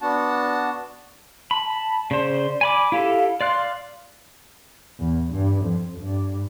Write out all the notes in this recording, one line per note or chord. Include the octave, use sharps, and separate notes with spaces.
B3 D4 F#4 F#5 A5
A5 B5
A5
C#3 C5 D5
G#5 B5 D6
E4 G4 A4 F5
D5 F5 C6 F#6
E2
G2
F2
G2